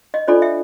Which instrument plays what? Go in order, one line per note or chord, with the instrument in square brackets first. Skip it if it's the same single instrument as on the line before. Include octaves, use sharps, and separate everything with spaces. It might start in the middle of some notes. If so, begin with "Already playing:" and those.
[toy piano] D#5
D4 F4 A4 C5 D5
E5